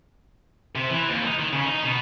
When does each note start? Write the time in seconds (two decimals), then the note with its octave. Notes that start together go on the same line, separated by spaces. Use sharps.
0.75 C3
0.90 E3
1.09 D#2
1.25 D#4
1.39 D#3
1.53 C#3
1.66 D#4
1.83 B2